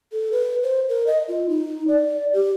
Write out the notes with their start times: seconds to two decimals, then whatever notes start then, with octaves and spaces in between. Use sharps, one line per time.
0.12 A4
0.32 B4
0.63 C5
0.89 A#4
1.07 D#5
1.28 F4
1.49 D#4
1.88 D5
2.33 G4